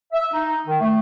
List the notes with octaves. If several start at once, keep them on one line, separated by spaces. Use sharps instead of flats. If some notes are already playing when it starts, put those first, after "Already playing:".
E5
D#4
D#3
A3